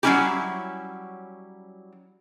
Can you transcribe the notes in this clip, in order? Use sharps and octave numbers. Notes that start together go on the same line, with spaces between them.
F#3 G3 A#3 C#4 E4 G4